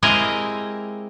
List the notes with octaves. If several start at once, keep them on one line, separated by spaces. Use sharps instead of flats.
G#3 C4 E4 G4 A#4 D#5